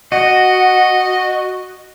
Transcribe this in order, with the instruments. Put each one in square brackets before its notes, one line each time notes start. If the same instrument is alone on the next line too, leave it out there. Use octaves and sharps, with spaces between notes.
[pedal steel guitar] F#4 [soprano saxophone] D#5